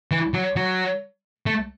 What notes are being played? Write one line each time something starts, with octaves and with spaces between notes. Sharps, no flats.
E3
F#3
F#3
A3